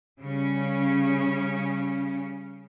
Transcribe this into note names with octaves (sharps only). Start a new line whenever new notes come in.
C#3 G3 C#4